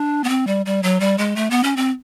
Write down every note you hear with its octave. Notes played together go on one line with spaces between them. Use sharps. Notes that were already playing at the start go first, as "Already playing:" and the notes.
Already playing: D4
B3
C4
G3
G3
F#3
G3
G#3
A3
B3
C#4
C4